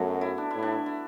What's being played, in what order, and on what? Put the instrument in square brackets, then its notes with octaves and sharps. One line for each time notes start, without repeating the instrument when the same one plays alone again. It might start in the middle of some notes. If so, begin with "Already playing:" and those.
Already playing: [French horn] F#2 [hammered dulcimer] F#3 A3 B3
[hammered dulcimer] E4
D4
[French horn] A2 [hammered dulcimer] E4
[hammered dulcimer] D4
E4